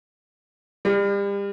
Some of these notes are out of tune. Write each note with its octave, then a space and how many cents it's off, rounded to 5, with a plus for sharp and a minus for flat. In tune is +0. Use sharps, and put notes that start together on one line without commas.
G3 +35